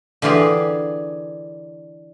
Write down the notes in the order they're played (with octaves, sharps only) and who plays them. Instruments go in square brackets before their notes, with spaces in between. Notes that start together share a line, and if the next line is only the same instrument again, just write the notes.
[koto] D3 E3 F4 G4 G#4